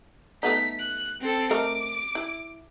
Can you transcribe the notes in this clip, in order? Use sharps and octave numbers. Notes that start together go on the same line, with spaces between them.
A3 B3 D#4 B6
F#6
C4 A4
A3 A#4 D#5 D6
E4